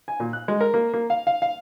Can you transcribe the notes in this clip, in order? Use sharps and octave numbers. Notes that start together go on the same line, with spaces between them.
G#5
A#2
F#6
G#3
A#4
A#3
A#3
F5
F5
F5